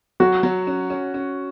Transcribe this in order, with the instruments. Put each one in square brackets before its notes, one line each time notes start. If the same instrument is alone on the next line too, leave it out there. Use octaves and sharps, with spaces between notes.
[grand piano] F#3 [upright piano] F#4
[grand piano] F#3
C#4
C#4
C#4